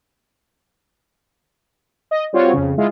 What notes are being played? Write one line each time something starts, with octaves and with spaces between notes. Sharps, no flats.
D#5
G3 C4 F4 F#4 C#5
F2 C#3
G#3 E4 F4